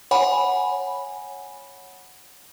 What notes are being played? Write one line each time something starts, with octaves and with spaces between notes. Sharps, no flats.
C#5 F#5 G#5 B5